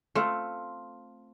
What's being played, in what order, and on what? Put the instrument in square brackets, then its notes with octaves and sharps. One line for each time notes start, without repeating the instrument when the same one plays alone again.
[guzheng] A3 C4 F4